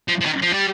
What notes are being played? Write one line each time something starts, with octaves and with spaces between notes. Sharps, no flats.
F3
F3
D#3
F3
G3